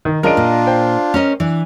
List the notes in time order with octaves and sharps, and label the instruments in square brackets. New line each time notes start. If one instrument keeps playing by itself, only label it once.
[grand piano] D#3
[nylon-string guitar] G#3 C#4 [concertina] D4 F4 [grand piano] A#4 D#5 D7
[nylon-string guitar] A#2
[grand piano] C5 G5
[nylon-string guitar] C#4 A#4 D#5
E3 D4